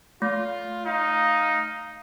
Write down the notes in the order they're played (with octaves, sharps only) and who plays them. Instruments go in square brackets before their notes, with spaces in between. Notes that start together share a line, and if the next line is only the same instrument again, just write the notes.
[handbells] A3 [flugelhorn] F4
[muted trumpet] D#4 [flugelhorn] F5